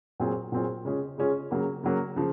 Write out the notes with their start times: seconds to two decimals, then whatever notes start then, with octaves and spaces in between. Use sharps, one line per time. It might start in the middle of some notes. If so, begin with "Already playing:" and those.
0.20 A#2 F#3 C4 F4 G#4
0.52 A#2 F#3 C4 F4 G#4
0.85 C#3 G#3 C#4 F4 G#4
1.18 C#3 G#3 C#4 F4 G#4
1.51 C#3 F#3 A#3
1.84 C#3 F#3 A#3
2.16 C#3 F3